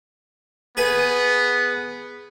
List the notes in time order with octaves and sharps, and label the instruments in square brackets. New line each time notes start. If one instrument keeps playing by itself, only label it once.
[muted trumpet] B3 [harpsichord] G#4 B4 G#5